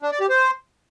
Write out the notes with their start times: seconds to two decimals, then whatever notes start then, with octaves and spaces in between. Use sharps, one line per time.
0.03 D4
0.11 D5
0.20 G4
0.29 C5